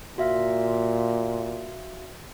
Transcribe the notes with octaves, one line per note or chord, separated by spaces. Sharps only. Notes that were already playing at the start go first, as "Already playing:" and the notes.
A#2 F#4 E5 F5